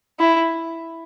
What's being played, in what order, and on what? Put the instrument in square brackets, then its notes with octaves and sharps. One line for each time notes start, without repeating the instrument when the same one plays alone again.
[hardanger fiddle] E4